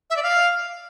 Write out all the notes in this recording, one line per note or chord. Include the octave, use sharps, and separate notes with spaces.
E5
D5
F5